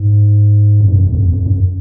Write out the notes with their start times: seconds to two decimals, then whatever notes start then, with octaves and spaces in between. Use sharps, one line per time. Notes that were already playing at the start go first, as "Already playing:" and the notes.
Already playing: G#2
0.81 F#2
0.88 G2
0.96 F#2
1.07 E2
1.15 F2
1.23 E2
1.33 F2
1.46 F#2